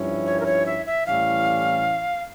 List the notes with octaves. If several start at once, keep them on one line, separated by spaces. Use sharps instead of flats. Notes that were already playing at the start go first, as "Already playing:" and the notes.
Already playing: G2 F3 C#4 E4
C#5
A#4
C#5
E5
E5
A2 E3 G3 C#4 F5